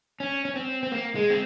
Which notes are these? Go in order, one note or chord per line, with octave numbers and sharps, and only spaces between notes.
C#4
C#4
C4
C4
A#3
G#3
C4